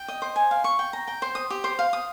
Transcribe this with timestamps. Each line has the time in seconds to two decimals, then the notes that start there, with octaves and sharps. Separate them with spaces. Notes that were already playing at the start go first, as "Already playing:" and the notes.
Already playing: G5
0.08 D#5
0.22 C5
0.36 G#5
0.51 F5
0.64 C#6
0.79 G5
0.93 A#5
1.08 G5
1.22 C5
1.35 D#6
1.50 G4
1.64 C5
1.79 F5
1.93 D#6